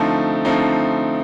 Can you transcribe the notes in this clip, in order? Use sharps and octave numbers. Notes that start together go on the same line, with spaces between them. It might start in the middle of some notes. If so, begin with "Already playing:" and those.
Already playing: D3 F3 A3 C4 D#4
D3 F3 A3 C4 D#4